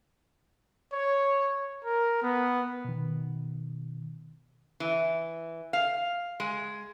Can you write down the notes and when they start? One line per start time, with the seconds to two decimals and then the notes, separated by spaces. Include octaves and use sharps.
0.93 C#5
1.85 A#4
2.23 B3
2.85 B2 D#3
4.80 E3
5.73 F5
6.40 G#3